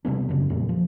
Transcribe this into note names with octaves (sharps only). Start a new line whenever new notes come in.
C3 G3 B3 D4
F#2 C#3
F2 A#2 G3 A#3
F3